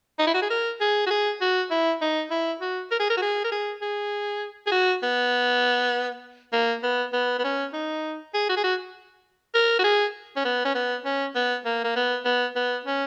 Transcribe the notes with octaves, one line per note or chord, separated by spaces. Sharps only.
D#4
E4
F#4
G#4
A#4
G#4
F#4
G#4
F#4
E4
D#4
E4
F#4
A#4
G#4
A#4
F#4
G#4
A#4
G#4
G#4
G#4
F#4
B3
A#3
B3
B3
B3
C#4
D#4
G#4
F#4
G#4
F#4
A#4
F#4
G#4
C#4
B3
C#4
B3
C#4
B3
A#3
A#3
B3
B3
B3
C#4